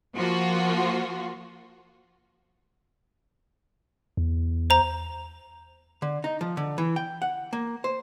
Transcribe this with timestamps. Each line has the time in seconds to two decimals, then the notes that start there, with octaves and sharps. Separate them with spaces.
0.16 F3 A#3 F4 F#4
4.17 E2
4.70 C5 A#5
6.02 D3
6.24 D#4
6.41 F3
6.57 D3
6.78 E3
6.96 G5
7.22 F#5
7.53 A#3
7.84 C5